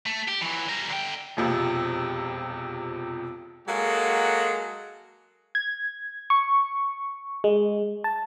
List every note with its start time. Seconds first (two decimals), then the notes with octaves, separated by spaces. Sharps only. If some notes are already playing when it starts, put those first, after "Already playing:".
0.06 A3
0.28 G4
0.41 E3 F#3
0.69 G3 A#4
0.90 D3 G5
1.37 E1 F2 C3
3.68 F#3 G#3 A#3 F#4 A4
5.55 G#6
6.30 C#6
7.44 G#3
8.04 A5